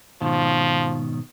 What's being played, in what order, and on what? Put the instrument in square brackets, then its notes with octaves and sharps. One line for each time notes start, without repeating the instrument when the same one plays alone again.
[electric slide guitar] G#2 B2 D#3 [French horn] F3